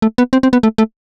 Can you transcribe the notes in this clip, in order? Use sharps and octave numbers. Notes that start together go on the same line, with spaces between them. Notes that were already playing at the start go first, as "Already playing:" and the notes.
A3
B3
C4
C4
B3
A3
A3